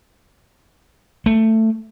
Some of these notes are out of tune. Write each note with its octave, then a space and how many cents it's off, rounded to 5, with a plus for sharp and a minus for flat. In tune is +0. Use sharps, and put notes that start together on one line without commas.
A3 +15